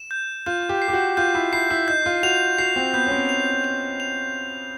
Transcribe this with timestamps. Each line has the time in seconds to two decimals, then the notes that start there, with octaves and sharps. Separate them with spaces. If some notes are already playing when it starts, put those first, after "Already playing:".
Already playing: E7
0.11 G6
0.46 F4 G6
0.69 G4
0.82 C7
0.88 G4
0.93 F#4
1.17 F4 G6
1.35 E4
1.53 E4 C7
1.70 E4
1.88 D#4 G6
2.06 F4
2.23 F#4 F7
2.58 F#4 C7
2.76 C4
2.93 B3 G6
3.07 C#4
3.12 C4
3.29 F7
3.64 F7
4.00 F7